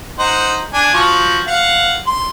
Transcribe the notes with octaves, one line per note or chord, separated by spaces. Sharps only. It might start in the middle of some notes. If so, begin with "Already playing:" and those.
D#4 C5 F#5
D4 G#5
F3 F#4
F5 F#5
C6